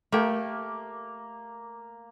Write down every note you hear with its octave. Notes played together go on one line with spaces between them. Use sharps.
A3 A#3 G4